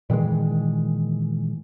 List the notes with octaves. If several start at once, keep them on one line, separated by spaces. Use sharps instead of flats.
A#2 D#3 E3 G#3